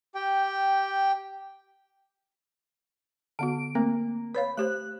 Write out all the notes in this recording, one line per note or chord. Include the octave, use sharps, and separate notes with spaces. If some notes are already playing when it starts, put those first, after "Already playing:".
G4 G5
D3 B3 F#4 D7
A3 A#3 C4
B4 C#5 F5 B5
A3 G4 C5 F#6